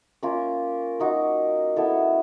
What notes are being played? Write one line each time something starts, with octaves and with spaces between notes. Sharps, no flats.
A#3 C#4 F4 A#4
A#3 D#4 F#4
B3 E4 A4